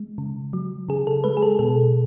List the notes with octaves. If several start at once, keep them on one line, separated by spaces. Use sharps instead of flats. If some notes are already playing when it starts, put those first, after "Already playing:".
Already playing: G#3
C#3
F#3
C#3 G#4
A4
G#3 B4
G#4
A4
B2 A4